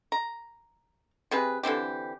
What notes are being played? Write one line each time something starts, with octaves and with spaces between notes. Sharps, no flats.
A#5
C3 C4 G#4 B4
D3 E3 C4 G4